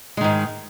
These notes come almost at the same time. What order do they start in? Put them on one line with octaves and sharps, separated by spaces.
G#3 D#3 G#2